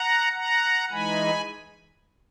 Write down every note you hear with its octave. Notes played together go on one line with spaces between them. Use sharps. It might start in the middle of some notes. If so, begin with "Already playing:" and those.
Already playing: F#5 A#5
F#5 A#5
E3 G#3 D#4 G#5 B5